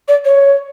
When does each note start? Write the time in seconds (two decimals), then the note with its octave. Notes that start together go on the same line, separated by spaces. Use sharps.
0.08 D5
0.25 C#5